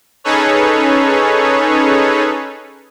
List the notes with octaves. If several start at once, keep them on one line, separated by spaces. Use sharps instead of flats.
C#4 D#4 G#4 A4 B4 C#5